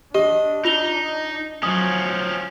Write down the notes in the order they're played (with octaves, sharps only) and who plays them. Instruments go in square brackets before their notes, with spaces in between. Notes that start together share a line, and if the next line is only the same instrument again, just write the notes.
[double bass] D4 [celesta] G4 [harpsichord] D#5
[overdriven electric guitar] D#4 [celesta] F4 F7 G7
[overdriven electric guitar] F3 C#4 [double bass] F#3 [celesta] D#6